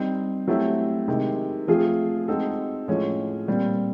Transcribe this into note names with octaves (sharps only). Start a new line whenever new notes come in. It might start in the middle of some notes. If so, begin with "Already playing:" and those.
Already playing: G3 C4 D#4
F#3 A3 C4 E4 G4
C3 D#3 G#3
F3 A3 C4 F4 G#4
G#3 C4 D#4 F#4 A4
A2 F3 G#3 C#4
A#2 G3 C4